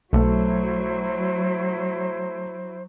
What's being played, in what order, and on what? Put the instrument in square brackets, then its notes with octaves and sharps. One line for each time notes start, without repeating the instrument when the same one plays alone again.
[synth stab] B1 [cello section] F#3 [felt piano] A3 [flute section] E4 C5